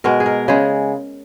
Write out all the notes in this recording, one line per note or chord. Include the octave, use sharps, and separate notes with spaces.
B2 G#3 A#4
G#4
A#4
C#3 G#3 G#4